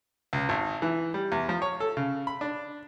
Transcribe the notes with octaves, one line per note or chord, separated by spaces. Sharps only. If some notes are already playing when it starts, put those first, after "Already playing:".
C#2
G#1
E3
G3
E2
F3
C#5
A4
C#3
B5
D4